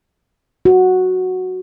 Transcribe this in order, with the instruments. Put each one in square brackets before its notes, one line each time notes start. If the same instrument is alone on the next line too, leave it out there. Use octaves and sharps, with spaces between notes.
[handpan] F#4